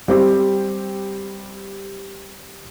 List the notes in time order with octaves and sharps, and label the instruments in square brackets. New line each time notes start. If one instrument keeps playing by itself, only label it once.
[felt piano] G3 C4 G4